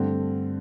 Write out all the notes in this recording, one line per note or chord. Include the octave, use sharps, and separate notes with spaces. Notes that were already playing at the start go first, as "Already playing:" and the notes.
Already playing: G2 D3 A3 C4